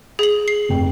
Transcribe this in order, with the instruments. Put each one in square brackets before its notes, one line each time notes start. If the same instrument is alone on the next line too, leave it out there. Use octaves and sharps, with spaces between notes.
[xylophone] G#4 F#7
C7
[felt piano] F1 G5